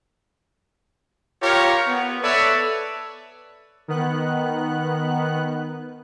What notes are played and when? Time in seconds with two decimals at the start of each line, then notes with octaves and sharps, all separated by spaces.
1.42 F4 G4 A#4 C#5
1.88 B3
2.23 A4 B4 C#5 D5 E5
3.88 D#3 B3 F#6